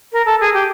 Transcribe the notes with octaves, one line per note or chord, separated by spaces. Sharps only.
A#4
A4
G#4
G4